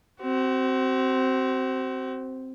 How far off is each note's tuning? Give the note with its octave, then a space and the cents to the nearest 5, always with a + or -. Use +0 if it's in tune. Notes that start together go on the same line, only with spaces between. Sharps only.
C4 +0 F#4 +40